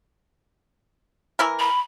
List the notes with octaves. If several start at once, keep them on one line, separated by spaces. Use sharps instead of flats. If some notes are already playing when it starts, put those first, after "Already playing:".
E3 E4 A#4
B5